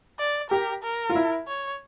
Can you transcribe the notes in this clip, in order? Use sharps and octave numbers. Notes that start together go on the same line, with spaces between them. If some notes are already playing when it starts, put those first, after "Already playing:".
D5
G4 A#4
A#4
F4
E4
C#5